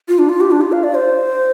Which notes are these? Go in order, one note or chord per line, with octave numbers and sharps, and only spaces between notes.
F4
D4
F4
G4
D4
F4
F5
D5
C5